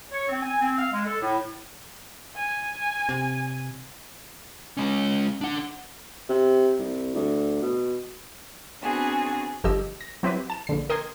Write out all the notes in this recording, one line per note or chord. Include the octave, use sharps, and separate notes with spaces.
C#5
C4
G#5
C4
F5
G#3
A4
A2
G#5
C3
G#3 C#4
D4 F#5
C3
C2
D2
B2
B3 C4 D4 F#4 G#4
G1 F3 G4 D#5 E6
A#6
F#3 C4 E4 G4 B4
A5 E7
A#1 D3 C7
A#4 D#5 G5 C6 G#6